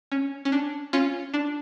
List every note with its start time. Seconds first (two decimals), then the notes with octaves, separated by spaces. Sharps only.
0.12 C#4
0.45 C#4
0.52 D4
0.93 C#4 F4
1.34 D4